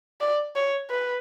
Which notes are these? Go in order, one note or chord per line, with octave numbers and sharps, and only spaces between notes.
D5
C#5
B4